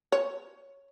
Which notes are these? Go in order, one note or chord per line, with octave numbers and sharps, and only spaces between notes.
C#5